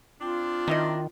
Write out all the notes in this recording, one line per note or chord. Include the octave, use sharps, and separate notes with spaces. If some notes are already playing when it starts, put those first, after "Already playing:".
C4 D4 F4
D#3 D#4 E4 D#5